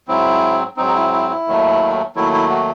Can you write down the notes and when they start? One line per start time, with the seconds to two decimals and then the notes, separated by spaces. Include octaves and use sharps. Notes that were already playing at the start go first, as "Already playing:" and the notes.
0.08 G#2 F#3 C4 E4
0.77 G#2 F#3 C4 D#4
0.87 D#4
0.95 E4
1.12 E4
1.29 E4
1.47 D#2 D#3 F#3 A3
2.16 D#2 D#3 F#3 A3 E4
2.33 E4
2.50 F#4